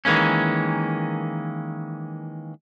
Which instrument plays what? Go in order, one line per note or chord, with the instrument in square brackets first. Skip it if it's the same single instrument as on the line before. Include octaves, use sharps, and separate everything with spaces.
[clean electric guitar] D#3 E3 G#3 A#3 C#4